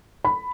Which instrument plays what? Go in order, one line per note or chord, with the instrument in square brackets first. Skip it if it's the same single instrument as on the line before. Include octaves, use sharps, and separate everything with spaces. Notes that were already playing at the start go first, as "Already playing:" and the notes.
[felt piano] B5